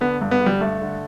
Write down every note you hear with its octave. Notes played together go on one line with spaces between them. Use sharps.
D3 B3
G2
B3
D3
G3
G2 A3
D3